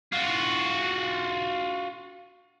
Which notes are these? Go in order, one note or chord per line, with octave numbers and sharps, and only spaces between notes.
F4 F#4